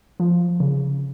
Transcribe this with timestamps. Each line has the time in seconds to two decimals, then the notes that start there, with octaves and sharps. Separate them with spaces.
0.20 F3
0.60 C#3